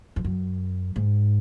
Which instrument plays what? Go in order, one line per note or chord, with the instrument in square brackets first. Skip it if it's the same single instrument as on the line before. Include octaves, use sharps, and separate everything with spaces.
[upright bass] F2
F#2
G#2